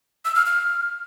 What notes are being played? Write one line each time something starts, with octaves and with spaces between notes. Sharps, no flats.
E6
F6
F6